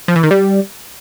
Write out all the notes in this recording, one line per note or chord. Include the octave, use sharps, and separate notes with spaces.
F3
E3
D#3
G3